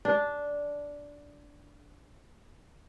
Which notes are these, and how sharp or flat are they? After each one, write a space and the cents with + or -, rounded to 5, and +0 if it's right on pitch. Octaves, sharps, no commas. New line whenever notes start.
D4 -10